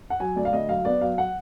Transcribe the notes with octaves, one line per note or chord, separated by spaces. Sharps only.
F#5
F#3 G#5
D2 D5
F5
D2 D#5
F#3 F5
B3 D5
F#3 F5
F#5